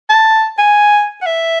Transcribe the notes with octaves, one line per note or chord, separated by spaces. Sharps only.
A5
G#5
F#5
E5